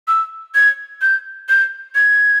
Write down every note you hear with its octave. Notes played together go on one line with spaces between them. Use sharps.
E6
G#6
G6
G6
G#6